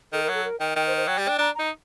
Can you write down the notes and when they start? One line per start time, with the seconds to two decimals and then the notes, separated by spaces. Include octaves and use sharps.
0.13 D#3 A4
0.24 A#4
0.29 F#3
0.34 A4
0.44 A#4
0.60 D#3 G5
0.76 D#3 G5
0.87 C5
0.97 C5
1.07 F#3 G5
1.18 G3
1.23 G5
1.29 D4
1.39 D4 A#5
1.55 D#4 A#5